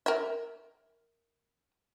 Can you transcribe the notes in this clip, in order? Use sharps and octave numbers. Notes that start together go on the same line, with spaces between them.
A#4 E5